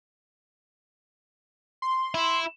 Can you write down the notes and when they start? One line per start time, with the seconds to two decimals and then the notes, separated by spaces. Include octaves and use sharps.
1.82 C6
2.14 E4